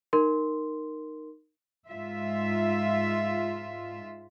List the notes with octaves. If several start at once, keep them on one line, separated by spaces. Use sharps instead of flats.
D#4 A#4 C6
G#2 F4 E5